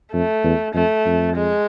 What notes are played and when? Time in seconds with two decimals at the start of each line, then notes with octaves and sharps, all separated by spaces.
0.13 F2 A3
0.44 E2
0.74 F2 A3
1.06 F2
1.36 G#3